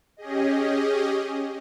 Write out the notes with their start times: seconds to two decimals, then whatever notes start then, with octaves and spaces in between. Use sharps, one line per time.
0.17 C#4 G4 G#4 D#5